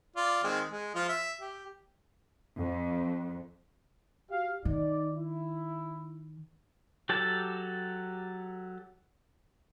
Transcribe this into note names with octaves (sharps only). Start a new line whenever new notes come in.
F4 D5
D#3 G#3 C4
G#3
F3 F4
E5
G4
F2
F#4 G4 F5
D#3 D#4 D5
E4
F#3 G4 A4 A5